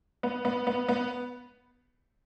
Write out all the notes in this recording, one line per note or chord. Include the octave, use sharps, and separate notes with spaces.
B3
B3
B3
B3